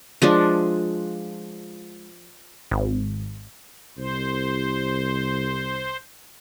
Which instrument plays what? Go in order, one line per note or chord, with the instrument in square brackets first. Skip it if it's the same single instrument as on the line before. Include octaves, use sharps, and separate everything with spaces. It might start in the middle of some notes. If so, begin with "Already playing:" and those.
[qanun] F3 G#3 D4
[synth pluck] G#1
[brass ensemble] C2 [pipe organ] C5